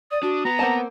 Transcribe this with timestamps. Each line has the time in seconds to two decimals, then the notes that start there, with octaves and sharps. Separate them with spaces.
0.11 D5 D#6
0.23 D4 F#4
0.45 B3 B4 A#5
0.59 A#3 C4 F#5 A5